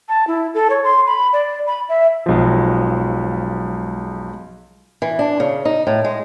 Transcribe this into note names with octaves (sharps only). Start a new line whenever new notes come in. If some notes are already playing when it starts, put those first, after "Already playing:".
A5
E4
A4
C#5
C6
B5
D5
B5
E5
B1 F#2 F3 G#3
E3
D4
C#3
D#4
A2
G#3